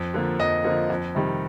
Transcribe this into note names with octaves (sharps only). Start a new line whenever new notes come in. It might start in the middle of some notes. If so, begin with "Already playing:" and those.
Already playing: F2
D3 F3 A#3
F2 D#5
D3 F3 A#3
F2
C3 D#3 G3